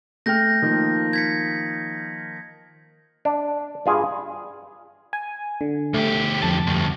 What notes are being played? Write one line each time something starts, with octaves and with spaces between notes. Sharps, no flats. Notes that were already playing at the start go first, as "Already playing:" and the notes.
A3 G5 F6 G6 A#6
D#3 F3 A#3
G#6 B6 C#7
D4
G2 F4 G#4
G#5
D3
D2 A3 G4
F2 A5 A6
D2 G2